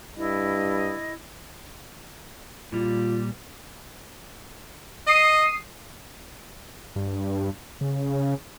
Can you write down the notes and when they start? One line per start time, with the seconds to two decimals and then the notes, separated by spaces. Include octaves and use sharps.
0.17 G2 E4 D#5
2.72 A#2 G3 F4
5.07 D#5 D#6 C7 D#7
6.96 G2
7.81 C#3